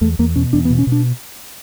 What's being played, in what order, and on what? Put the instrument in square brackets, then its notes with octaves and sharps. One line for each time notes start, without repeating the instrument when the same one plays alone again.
[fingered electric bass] E2 A3
E2 A#3
B2 C#4
E2 D4
B3
B2
C#4
B2
D4